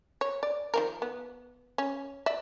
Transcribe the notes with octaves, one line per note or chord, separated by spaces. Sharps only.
C#5
D5
D#3 F3 A#4
B3
C#4
D5 E5